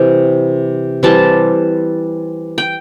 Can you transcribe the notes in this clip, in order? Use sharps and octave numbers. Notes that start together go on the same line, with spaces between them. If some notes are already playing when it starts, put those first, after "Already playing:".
Already playing: C3 E3 G3
E3 G3 C4 A5
G5